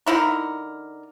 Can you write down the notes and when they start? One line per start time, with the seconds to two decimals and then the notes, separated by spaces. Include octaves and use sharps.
0.06 D3 D#4 E4 A#4